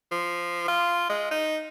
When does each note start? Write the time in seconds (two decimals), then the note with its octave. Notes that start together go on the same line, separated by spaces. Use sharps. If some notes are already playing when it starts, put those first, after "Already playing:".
0.11 F3
0.68 F4
1.09 G#3
1.31 D#4